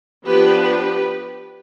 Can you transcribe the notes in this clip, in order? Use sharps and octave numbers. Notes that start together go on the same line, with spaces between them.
F3 B3 D4 G4 B4
G4 B4